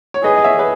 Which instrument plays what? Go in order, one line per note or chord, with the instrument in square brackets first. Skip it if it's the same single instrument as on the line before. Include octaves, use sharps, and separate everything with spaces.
[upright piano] C#5
[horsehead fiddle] G#4 [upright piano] B4 D#5
[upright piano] D#5
C#5 E5
B4